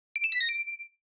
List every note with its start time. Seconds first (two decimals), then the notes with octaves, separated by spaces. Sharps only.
0.16 D7
0.24 E7
0.32 B6
0.41 A#6
0.49 D7